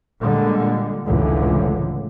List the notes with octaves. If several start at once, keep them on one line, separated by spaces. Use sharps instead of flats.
A#2 D3 G3 G#3
F1 C#2 A2 D3 E3